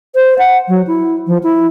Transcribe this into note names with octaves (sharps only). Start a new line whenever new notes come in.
C5
F#5
F#3
E4
F3
E4